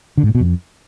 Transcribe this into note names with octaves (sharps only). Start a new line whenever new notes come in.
D3
G#2
A#2
B2
F2